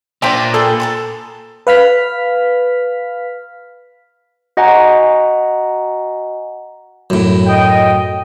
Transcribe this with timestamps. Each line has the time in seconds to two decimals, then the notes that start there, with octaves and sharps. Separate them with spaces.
0.22 A#2 D4 C5 E5 G5 A5 A#5
0.54 G#4 A4 B4 G5
0.80 A5 A#5 C6
1.67 B4 F5 F6 B6
4.57 F#4 D#5 F#5 G#5 A#5
7.10 F#2 A2
7.46 D#5 G5